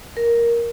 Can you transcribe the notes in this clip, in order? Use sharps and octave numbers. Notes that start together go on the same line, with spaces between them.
A#4